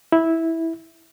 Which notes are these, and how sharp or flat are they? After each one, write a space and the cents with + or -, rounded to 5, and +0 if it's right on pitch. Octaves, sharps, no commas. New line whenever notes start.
E4 -10